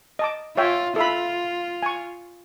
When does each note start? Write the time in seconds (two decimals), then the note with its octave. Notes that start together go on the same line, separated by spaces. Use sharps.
0.19 D#5 A5 D6
0.57 F4 C#5 E5 G5
0.96 F4 A4 E5 B5
1.83 G#5 C#6